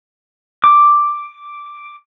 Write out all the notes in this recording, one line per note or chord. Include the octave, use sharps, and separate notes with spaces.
D6